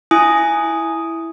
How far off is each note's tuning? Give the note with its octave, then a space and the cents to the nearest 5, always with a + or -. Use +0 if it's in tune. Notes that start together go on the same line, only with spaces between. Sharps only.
E4 +0 G#5 +0 D#6 +0